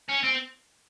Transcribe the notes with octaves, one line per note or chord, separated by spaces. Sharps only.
C#4
C4